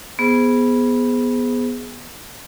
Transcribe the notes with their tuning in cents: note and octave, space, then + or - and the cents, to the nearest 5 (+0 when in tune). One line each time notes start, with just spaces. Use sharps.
B3 -10 G#4 +0 C5 -10